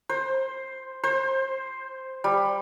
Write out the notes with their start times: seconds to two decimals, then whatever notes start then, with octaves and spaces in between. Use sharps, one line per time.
0.09 C5
1.04 C5
2.24 G3